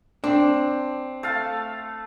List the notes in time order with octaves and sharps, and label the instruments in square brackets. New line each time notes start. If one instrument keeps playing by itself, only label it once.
[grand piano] C4 [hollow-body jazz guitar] D4
[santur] A3 F5 A5